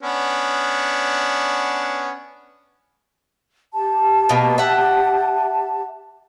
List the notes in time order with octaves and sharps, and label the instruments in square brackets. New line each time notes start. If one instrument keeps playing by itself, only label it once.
[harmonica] B3 C#4 D4
[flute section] G4 A5
[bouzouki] B2 A#3
E5 F#5